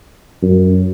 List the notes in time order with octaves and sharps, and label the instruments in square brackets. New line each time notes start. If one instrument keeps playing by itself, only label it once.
[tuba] F#2